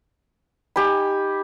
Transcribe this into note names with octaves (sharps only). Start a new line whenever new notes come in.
D#4 G4 G#5 B5